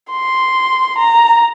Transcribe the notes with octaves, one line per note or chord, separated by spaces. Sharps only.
C6
A#5